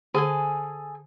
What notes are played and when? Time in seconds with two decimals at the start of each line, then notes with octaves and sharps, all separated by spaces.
0.14 D3 G#4 A4 G#5